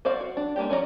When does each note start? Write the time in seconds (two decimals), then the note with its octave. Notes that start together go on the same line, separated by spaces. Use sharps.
0.05 F#4 C5 D5 F5
0.20 F#4
0.37 D4
0.56 G#3 A#3 D4 G4
0.69 F3 C#4 D4 D5 A#5